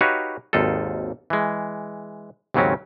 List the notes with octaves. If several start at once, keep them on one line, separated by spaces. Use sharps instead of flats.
D#4 F#4 G4 B4 C#5 F5
G#1 D#2 D#4 F4 A4
E3 G#3
D#2 G#2 C#3 F#3 C4 C#4